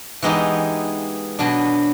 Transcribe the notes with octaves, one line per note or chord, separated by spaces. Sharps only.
E3 G#3 B3 D#4 G4
B2 F#3 B3 D4